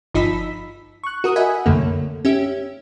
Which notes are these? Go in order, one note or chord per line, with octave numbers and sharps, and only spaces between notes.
G1 F3 D#4 B5 E6 B6
C#6 F#6
F#4 A#4 D#6 F#6
D#5 E5 F#5 G#5 B5
C2 F#2 D3 A3 A#3
C#4 G4 E5